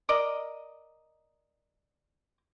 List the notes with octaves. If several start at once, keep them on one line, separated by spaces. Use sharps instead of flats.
A#4 D5 D#5